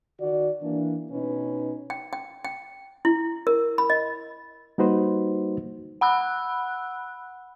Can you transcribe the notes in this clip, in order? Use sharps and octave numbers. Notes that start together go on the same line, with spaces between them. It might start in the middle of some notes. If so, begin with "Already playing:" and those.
D#3 F#4 D5
E3 A#3 D4
B2 C#4 D#4 B4
G5
G5
G5
E4
A#4
B5
D#5
G3 A#3 D#4 F#4 B4 C5
F#5 B5 E6 F#6